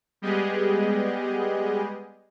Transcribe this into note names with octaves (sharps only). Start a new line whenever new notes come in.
G3 G#3 B3 G4 G#4 D#5